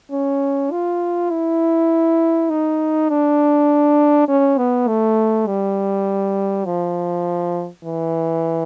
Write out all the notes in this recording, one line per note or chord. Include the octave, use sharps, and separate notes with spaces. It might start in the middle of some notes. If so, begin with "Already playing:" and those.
C#4
F4
E4
D#4
D4
C#4
B3
A3
G3
F3
E3